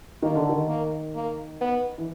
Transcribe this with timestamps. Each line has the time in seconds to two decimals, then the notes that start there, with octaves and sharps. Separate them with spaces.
0.22 D#3 A#3
0.35 D3
0.49 D#3
0.68 A#3
1.15 A#3
1.61 B3
1.98 E3